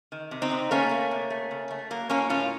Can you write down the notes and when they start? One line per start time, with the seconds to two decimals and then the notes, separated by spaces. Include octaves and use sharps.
0.12 D#3
0.31 C3
0.42 C4 D#4
0.51 C3
0.71 A3 A#3 C#4
0.91 A3
1.11 C3
1.30 A3
1.51 C#3
1.70 A3
1.90 F#3 A#3
2.10 A2 A#3 C#4
2.29 A2 C#4 F4